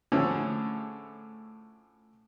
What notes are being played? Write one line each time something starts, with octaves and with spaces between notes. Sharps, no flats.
A2 D3 F3 A3 C#4 G#4